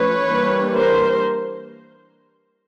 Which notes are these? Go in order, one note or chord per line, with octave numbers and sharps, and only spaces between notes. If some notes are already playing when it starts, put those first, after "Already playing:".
Already playing: F3 A3 C#4 B4 C#5
E3 G3 A#3 D4
A#4 C5